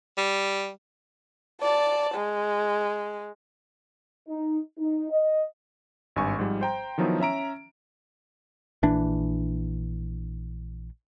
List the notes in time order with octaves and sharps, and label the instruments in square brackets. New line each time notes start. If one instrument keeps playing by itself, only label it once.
[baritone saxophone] G3
[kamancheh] D5 A5
G#3
[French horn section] D#4
D#4
D#5
[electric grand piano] G#1 G2 G#5 C#6
G#2 F3 G3
C5 G5 A#5
D#3 F3 F#3 B3 D#4 E4
C#4 E5 A#5 D7
[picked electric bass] A#1 E3 D4